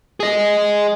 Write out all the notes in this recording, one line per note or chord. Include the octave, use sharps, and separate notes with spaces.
G#4 D#5